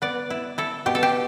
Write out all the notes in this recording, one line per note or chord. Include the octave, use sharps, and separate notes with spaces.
B3 D5
E4
E4 A4
B2 G4
A4
G4